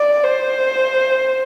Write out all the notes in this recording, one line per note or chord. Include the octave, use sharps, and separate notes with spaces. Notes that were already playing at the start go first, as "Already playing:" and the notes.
Already playing: D5
C5